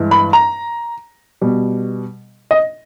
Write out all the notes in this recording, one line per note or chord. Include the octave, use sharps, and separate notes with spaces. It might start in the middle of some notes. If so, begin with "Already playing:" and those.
Already playing: G2 E3 G#3
B5
A#5
B2 G3
D#5